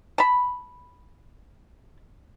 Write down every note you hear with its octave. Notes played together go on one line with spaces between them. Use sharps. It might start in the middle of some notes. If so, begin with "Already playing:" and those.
A5 B5